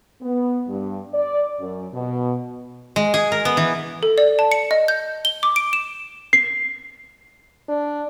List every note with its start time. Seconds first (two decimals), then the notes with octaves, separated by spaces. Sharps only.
0.21 B3
0.67 G2
1.13 D5
1.59 F#2
1.92 B2
2.96 G#3
3.14 G#4
3.32 A#4
3.45 B3
3.57 E3
4.03 A4
4.18 D5
4.39 A5
4.52 C#7
4.71 D#5
4.88 G6
5.25 G7
5.43 D6
5.56 D7
5.73 E7
6.33 C7
7.69 D4